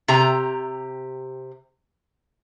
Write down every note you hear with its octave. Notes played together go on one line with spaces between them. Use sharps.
C3 G4 A#5